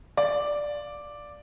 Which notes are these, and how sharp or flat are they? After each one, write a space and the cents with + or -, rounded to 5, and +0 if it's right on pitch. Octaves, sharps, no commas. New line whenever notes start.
D5 +0 F5 +0